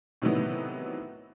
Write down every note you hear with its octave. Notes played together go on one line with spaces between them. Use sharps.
A2 C3 D#3 E3 F#3 B3